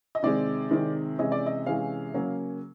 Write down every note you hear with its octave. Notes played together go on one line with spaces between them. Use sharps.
D#5
C3 D#3 G#3 C4 D5
C3 D#3 G#3 C4
C3 E3 G#3 C#4 D#5
D5
D#5
C3 E3 G#3 C#4 F5
C#3 F#3 A#3 C#4